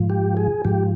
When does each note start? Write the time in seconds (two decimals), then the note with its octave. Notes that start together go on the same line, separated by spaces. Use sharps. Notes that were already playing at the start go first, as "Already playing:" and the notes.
Already playing: G#2 F3
0.10 G4
0.37 G#4
0.65 G#2 F3 G4